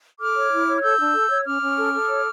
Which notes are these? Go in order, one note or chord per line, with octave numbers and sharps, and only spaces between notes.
A4 D6 F6
C#5
E4
C#5
F6
A4 E6 G6
D4
A4
C#5
C#4 D6 F6
C#4
A4
A4
C#5